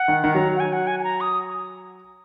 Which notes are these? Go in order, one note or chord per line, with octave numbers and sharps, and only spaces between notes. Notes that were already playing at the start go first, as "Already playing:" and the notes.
Already playing: F#5
D#3
D#3
F#3 A#5
F#5
G#5
F#5
G#5
G#5
A#5
D#6